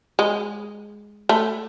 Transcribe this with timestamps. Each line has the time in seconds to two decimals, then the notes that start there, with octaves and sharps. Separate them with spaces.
0.19 G#3
1.29 A3